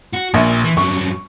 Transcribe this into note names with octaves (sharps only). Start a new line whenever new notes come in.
F#4
A#1 A#2
E3
G2 F#3 C#6